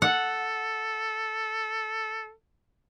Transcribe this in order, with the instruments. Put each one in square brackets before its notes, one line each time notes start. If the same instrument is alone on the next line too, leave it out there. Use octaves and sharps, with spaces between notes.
[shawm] A4 [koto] F#5